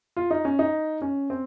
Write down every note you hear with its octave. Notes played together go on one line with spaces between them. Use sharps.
F4
D#4
C#4
D#4
C#4
C4